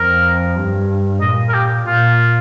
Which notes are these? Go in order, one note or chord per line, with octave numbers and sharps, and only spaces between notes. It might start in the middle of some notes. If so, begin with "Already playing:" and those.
Already playing: F2 A#4
G2
A#2 D#5
A#4
G4
A#2 F4